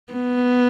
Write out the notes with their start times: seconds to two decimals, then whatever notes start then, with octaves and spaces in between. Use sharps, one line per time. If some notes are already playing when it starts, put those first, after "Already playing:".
0.13 B3